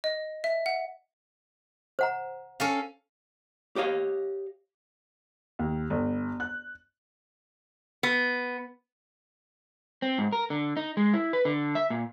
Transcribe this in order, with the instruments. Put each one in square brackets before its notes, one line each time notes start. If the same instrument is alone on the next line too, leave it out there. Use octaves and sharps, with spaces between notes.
[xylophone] D#5
E5
F#5
[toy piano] C5 F#5 A#5
[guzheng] C#4 A4 F5
[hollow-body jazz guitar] G4 C#5 D#5 F5
[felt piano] D#2
G1
F#6
[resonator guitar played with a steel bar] B3
[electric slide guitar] C4
G#2
A#4
D3
D#4
G#3
E4
B4
D3
E5
A#2